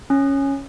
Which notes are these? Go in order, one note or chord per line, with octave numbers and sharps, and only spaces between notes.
C#4